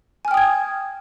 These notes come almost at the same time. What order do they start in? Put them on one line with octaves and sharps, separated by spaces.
G#5 F6 G5 D#6 G#6